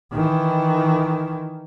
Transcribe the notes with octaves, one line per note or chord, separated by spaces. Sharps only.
D#3 E3